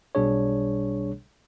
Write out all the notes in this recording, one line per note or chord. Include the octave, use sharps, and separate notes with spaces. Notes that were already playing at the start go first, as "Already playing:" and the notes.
B1 B2 G3 D4 G#4 C#5